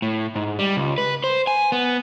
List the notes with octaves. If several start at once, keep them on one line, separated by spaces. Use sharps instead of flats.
A2
G#2
G3
C#2
B4
C5
G#5
B3